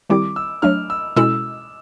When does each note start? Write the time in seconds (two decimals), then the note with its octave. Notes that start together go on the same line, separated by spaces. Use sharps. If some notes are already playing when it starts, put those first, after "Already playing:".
0.09 D#3 G3 C4 E4 G4 D6
0.36 E6
0.62 F#3 A3 D4 F6
0.90 E6
1.16 B2 G#3 C#4 E4 A4 E6